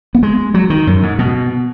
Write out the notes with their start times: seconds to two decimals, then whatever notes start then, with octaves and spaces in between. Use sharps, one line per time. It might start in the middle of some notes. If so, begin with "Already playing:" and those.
0.15 B3
0.23 G#3
0.54 F#3
0.70 D#3
0.87 F#2
1.03 G#2
1.19 B2